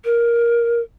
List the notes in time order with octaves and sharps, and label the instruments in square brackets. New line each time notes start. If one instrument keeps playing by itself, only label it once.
[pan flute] A#4